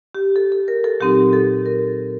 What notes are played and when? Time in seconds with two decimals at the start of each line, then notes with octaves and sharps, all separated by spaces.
0.15 G4
0.36 A4
0.52 A4
0.68 A#4
0.84 A4
1.00 A#2 F#3 C4 D#4 G4
1.33 A4
1.66 A#4